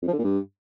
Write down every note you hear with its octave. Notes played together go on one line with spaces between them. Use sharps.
F2
F3
D3
A#2
G2